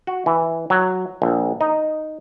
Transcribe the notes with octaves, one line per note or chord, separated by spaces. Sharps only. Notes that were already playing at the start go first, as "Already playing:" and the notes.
F#4
E3
F#3
A#1
D#4